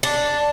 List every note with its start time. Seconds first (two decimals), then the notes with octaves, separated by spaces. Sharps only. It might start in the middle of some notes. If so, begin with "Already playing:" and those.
0.03 D4